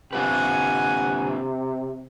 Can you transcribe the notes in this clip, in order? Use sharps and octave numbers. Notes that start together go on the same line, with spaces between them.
C3 D4 F4 B4 F#5 G#5